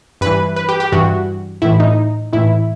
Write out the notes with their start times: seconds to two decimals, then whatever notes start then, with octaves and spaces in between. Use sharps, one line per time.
0.21 G2 E3 B4
0.56 B4
0.69 G4
0.80 G4
0.92 G2 E3 F#4
1.62 A2 E3 E4
1.80 D#4
2.33 A2 E3 E4